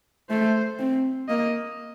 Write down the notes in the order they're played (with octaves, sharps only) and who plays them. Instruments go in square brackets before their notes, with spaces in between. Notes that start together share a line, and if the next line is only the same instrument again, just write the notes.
[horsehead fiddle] A3 [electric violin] C5
[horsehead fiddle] C4
[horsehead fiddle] A#3 [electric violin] D#5